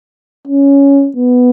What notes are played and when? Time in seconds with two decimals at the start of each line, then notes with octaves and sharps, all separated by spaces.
0.47 C#4
1.16 B3